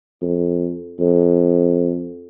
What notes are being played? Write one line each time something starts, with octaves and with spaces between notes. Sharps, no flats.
F2
F2